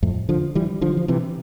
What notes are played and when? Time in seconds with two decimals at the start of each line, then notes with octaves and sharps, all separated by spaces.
0.03 F2 A2
0.29 D3 F3
0.55 E3 G3
0.81 D3 F3
0.97 F3
1.08 C3 E3